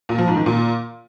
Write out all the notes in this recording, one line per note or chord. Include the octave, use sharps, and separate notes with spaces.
A#2
F3
G#2
D#3
A#2